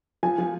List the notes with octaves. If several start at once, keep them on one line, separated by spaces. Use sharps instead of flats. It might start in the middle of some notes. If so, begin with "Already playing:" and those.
F3 G#5
F3